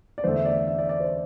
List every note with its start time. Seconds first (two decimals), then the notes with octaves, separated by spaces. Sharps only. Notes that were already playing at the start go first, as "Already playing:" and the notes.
0.18 D5
0.24 E2 D3 A3 C5
0.36 E5
0.45 D5
0.67 E5
0.78 D5
0.89 D5
1.00 C5